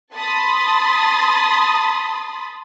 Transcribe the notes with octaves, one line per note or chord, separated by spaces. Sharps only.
A5 B5 C6 D#6 A6